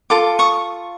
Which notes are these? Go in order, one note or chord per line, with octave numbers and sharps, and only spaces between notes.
F4 A4 D6
C#6 D#6